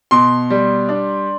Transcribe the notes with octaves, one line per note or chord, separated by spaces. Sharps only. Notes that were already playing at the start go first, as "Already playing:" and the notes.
B2 C6
G3
D4